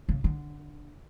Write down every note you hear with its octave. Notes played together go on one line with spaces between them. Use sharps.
C#3
D3